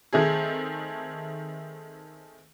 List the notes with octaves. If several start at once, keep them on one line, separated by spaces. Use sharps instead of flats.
D#3 A3 C4 G#4